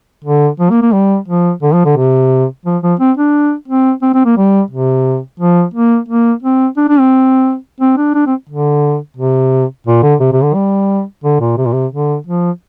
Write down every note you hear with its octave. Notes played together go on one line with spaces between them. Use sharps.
D3
F3
A#3
A#3
G3
F3
D3
F3
D3
C3
F3
F3
C4
D4
C4
C4
C4
A#3
G3
C3
F3
A#3
A#3
C4
D4
D4
C4
C4
D4
D4
C4
D3
C3
A#2
D3
C3
C3
D3
G3
D3
A#2
C3
A#2
C3
D3
F3